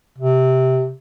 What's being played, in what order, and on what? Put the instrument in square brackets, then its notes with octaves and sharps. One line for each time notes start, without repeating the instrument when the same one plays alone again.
[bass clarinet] C3